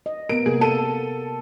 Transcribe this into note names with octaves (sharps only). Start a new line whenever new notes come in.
D#5
B3 A#4 D7
C3 A#3 G#4 A#4
A4 D#7